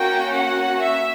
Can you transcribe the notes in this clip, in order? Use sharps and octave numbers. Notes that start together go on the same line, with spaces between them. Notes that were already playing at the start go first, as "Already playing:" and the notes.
Already playing: A#3 C#4 F#4 G5
F#5
E5